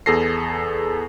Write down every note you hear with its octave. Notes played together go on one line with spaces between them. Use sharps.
E2 G#4 A4 A#6 C7